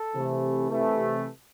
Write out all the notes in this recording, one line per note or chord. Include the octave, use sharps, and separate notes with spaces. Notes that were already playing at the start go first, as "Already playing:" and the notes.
Already playing: A4
C3 E3 A3
C3 E3 A3